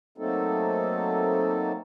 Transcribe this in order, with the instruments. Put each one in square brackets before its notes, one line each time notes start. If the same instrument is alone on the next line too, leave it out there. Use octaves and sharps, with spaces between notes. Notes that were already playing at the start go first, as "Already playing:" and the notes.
[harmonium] F#3 A3 A#3 C4 D#4 A4